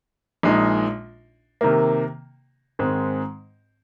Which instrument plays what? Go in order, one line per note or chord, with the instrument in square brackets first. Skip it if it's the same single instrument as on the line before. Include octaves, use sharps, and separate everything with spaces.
[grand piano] A#1 A#2 G#3 D#4
C3 D#3 A#3
G#2 D#3 G#3 C4